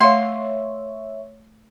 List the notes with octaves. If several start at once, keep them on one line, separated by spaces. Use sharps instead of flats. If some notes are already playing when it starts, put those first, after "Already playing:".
A3 C#5 E5 F5 C6